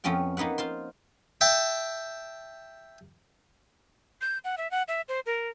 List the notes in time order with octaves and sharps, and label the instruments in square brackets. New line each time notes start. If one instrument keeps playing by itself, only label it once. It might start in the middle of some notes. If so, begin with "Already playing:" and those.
[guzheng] F2 B3 C#4 F4 G5
A#3 B3 D#4 B4 F#5
F4 C5 C6
[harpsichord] E5 G5 A5
[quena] G6
F#5
E5
F#5
E5
C5
A#4